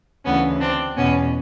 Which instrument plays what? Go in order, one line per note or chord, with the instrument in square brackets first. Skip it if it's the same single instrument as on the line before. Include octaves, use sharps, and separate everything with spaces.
[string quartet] D2 C#3 E3 B3 C#4
C4 D4
E2 B2 B3 C#4